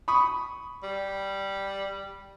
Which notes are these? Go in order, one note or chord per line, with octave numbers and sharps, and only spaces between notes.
B5 C#6 D#6
G3